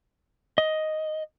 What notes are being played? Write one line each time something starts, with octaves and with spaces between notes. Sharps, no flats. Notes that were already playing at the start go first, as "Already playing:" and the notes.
D#5